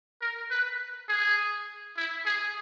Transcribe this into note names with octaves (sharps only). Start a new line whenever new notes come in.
A#4
B4
G#4
E4
G#4